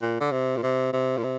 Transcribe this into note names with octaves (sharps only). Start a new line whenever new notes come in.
A#2
D3
C3
A#2
C3
C3
A#2
C3